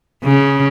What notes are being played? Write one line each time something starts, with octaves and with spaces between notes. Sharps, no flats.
C#3